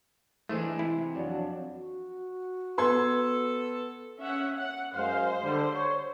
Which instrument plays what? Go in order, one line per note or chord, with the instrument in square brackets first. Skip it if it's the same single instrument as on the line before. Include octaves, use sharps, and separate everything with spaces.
[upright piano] E3 [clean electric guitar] G#3 D4 [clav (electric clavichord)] A3 C5
[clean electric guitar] C3 [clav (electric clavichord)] E4
[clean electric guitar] F2 [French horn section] F#3 D4
[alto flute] F#4
[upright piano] B3 C6 G#6 [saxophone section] A4
[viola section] C#4 E5 F#5
F#5
[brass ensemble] F#2 G#3 F5 [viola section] C5
[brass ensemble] D3 G3
C#5